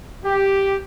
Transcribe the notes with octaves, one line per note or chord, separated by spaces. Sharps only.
G4